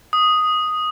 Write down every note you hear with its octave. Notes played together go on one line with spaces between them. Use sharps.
D#6